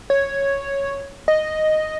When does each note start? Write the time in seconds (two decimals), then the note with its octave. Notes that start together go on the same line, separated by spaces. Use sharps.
0.10 C#5
1.28 D#5